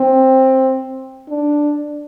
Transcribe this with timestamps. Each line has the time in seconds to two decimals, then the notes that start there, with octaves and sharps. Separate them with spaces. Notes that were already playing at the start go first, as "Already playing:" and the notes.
Already playing: C4
1.29 D4